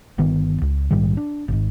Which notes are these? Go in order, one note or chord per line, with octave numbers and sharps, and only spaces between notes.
G1 D#3 B3
C#2
A#1 G#2 D#3 G3
D4
G#1 G#2